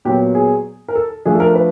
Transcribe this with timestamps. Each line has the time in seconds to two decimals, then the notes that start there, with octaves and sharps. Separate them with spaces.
0.05 A#2 F#3 B3 G4
0.35 G#4
0.88 A#4
0.96 A4
1.25 F3 A3 D4 G#4
1.35 A4
1.40 A#4
1.55 B4